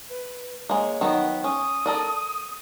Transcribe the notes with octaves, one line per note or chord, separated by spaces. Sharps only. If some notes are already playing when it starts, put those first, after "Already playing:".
B4
G#3 A#3 C#5
D#3 F#3 B3
C#4 D#6
A4 A#4 D5